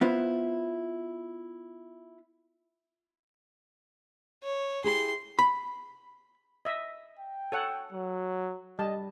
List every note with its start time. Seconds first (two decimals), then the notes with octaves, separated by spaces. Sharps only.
0.01 B3 E4 F4 B4 C5
4.43 C#5
4.84 E4 G4 G#4 C6
5.39 B5
6.65 D#5 E5
7.19 G5
7.52 A4 C#5 F#5
7.92 F#3
8.79 G3 D#5 A5